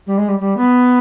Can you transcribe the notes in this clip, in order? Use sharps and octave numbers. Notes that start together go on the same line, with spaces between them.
G3
G#3
G3
G3
B3